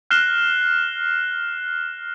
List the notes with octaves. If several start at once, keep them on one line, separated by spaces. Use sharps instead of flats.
F6 F#6 A#6 C7 E7 G7